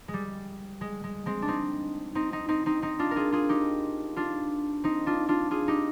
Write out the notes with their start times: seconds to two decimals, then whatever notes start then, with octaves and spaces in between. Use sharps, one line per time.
0.08 G#3
0.14 G3
0.81 G#3
1.04 G#3
1.26 G#3 C4
1.42 D4
1.48 C4 D#4
2.15 C4 D#4
2.32 C4 D#4
2.48 C4 D#4
2.66 C4 D#4
2.82 C4 D#4
2.99 D4 F4
3.11 A#4
3.16 F4 G#4
3.32 F4 G#4
3.49 D#4 G4
4.16 D4 F4
4.84 C4 D#4
5.06 D4 F4
5.28 D4 F4
5.51 F4 G#4
5.68 D#4 G4